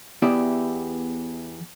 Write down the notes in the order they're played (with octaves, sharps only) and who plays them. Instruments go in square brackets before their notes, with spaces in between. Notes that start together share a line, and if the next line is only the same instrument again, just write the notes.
[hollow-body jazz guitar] E2 B3 E4 G4 D5